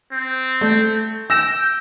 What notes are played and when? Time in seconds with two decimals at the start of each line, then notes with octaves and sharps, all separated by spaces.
0.12 C4
0.61 A3
1.30 G5 E6 A#6 E7